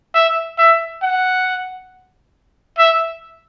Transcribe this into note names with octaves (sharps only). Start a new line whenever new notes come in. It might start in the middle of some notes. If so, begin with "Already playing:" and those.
E5
E5
F#5
E5